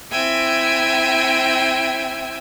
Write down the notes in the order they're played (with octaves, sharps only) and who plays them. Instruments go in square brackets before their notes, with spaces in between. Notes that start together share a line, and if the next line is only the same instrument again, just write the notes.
[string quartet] C4 E4 E5 G5 G#5